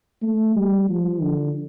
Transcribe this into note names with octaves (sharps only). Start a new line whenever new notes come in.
A3
G3
F3
D3